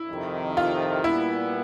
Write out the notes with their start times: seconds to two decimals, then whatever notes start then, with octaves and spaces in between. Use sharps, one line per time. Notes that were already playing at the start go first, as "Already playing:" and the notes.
Already playing: E4
0.09 F2 C3 D#3
0.57 F4
1.04 A#2 G3 B3 E4